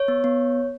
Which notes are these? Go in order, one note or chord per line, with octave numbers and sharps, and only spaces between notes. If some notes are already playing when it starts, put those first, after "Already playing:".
Already playing: C#5
B3
B3